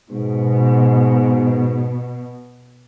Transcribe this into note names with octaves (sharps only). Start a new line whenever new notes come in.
G#2 B2